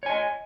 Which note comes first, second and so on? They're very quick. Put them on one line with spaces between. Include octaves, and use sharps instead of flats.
C#5 G#5 D#5